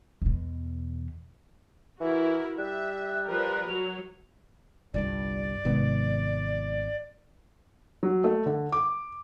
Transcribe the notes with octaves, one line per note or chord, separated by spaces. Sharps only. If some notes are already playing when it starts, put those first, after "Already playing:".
E2 B2
E3 E4 F#4 A#4
G3 E5 F#6
F3 A#4 B4
F#3 F7
G1 C2 G2 F4 D5
G#1 G#2 C3 D#3 B3
F#3
A3
D3
D6